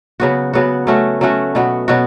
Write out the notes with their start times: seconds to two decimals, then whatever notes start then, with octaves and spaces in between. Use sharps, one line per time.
0.20 C#3 F#3 B3 F#4
0.53 C#3 F#3 B3 F#4
0.87 F#3 A3 C#4 F#4
1.21 F#3 A3 C#4 F#4
1.55 B2 F#3 B3 F#4
1.88 B2 F#3 B3 F#4